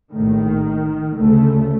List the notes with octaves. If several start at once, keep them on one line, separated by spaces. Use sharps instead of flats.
A#1 A2 D#3
D2 C#3 A3